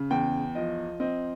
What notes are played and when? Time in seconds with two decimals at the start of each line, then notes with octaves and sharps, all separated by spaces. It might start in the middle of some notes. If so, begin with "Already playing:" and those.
Already playing: C#3
0.10 E2 G5
0.55 F3 D#5
1.00 C4 D#5